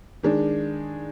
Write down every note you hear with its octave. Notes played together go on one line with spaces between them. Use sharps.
D#3 G#3 D4